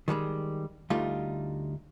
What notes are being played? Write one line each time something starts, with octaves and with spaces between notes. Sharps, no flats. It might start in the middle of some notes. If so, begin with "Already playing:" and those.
D#3 E3 G3 G#3
D2 G3 A3 D#4 F4